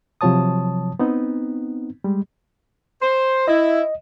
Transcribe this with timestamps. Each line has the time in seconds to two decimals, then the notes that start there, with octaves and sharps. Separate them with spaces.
0.21 C3 F3 F#3 C#5 A5 D#6
0.99 B3 C4 D#4
2.04 G3 G#3
3.02 C5
3.48 E4 D#5